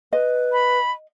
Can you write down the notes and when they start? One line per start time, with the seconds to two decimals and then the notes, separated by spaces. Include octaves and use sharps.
0.13 B4 D#5
0.52 B5